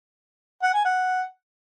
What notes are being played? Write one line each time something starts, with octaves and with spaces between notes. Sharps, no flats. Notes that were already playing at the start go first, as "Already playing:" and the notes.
F#5
G#5
F#5